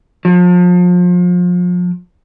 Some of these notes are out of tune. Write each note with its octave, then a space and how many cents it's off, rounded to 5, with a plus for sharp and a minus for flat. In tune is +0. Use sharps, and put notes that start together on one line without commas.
F3 +35